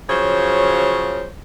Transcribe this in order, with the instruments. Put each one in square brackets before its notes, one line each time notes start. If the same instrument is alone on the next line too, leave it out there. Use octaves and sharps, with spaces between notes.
[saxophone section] C#3 F3 F#3 C5 C#5